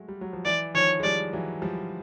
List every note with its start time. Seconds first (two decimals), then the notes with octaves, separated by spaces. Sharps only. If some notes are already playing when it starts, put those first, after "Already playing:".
Already playing: F#3 G#3 A3
0.08 G3
0.21 F#3
0.33 F3
0.45 E3 D5
0.75 D#3 F3 C#5
1.00 G#3
1.03 F3 G3 D5
1.33 E3 F#3
1.62 F3 G3